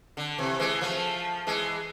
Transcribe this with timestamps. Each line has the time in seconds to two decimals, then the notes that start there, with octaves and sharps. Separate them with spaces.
0.17 D3
0.38 C3 E3
0.60 E3 G#3
0.81 F3 A3
1.47 E3 G#3